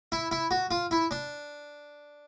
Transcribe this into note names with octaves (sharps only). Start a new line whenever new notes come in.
E4
E4
F#4
F4
E4
D4